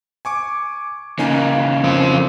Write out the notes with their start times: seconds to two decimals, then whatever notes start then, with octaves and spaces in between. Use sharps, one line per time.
0.25 G#5 C#6 D6
1.19 C#3 E3 A#3 D#4 G#5
1.84 F3 C4